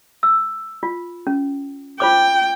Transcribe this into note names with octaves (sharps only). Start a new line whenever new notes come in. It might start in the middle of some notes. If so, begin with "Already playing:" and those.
E6
F4
C#4
F4 C5 G5 D6